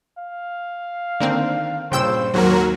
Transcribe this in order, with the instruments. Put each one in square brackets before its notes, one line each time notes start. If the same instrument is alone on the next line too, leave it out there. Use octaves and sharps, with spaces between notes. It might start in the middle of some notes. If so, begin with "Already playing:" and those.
[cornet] F5
[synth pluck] D3 A#3 C4 [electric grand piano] D#3 D4
[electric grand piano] G2 A#2 [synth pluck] C#3 G5 E6 [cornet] C5
[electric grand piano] D#2 G#2 A#3 [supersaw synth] F#3 F#4 A#4